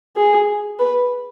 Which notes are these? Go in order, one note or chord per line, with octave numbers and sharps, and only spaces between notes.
G#4
B4